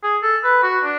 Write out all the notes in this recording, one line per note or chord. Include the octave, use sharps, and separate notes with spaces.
G#4
A4
B4
F#4
D4